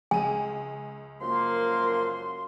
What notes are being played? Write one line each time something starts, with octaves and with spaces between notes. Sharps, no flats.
C#2 G#5 D#7
F#2 F3 A#3 C6